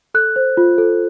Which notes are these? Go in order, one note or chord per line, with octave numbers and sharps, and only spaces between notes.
A4 F#6
C5
F4
A4